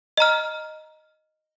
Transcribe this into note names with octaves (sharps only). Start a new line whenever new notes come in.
D#5 A#5 F6